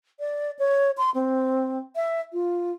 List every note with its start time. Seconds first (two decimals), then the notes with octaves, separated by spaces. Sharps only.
0.20 D5
0.59 C#5
0.98 C6
1.15 C4
1.96 E5
2.33 F4